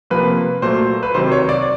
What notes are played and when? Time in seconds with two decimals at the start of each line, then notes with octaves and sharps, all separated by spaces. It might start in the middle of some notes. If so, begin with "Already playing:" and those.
0.10 C3 F3 A#3 B4
0.62 A#2 F#3 A3 C5
1.03 B4
1.14 C3 D#3 F#3 C5
1.32 C#5
1.49 D5